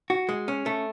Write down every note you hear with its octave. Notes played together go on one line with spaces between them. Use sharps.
F#4
G#3
C#4
A3